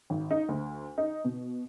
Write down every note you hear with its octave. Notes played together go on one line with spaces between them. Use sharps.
G#1
D#4
D2
D#4
B2